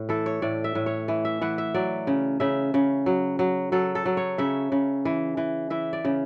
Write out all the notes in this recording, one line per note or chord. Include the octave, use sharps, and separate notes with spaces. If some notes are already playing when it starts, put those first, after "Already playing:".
Already playing: A2
E3 A4
C#5
A2 D5
E5
A2
C#5
E3
E5
E3 F#5
E5
F#3 D5
C#3
C#3 E5
C#3
F#3
F#3
F#3 A4
A4
F#3
C#5
C#3 E5
C#3
E3
E3
E3 E5
D5
C#3